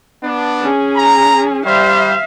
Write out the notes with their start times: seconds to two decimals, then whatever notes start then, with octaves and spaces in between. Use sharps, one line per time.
0.24 B3 D4
0.61 C#4 G#4
0.96 A#5
1.66 G3 C5 E5 F5